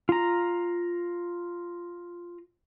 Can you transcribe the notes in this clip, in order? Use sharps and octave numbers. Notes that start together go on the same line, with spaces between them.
F4 A#5